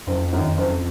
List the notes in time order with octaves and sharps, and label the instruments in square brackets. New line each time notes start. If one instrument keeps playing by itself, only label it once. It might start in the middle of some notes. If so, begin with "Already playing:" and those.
[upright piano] F#1 [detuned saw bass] F2
[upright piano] F#2 D#3
F#1